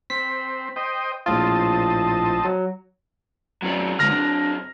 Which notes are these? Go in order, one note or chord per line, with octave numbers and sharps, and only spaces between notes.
C4 B6
C5 D#5 G5
A#1 A2 C4 F4 D#5 A5
F#3
F#2 F#3 C4 C#4 D5
D3 G#3 F6 A#6
D4